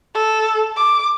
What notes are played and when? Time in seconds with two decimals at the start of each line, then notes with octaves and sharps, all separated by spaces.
0.14 A4
0.77 D6